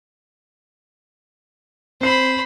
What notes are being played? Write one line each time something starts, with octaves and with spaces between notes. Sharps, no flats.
C4 C5 B5 C7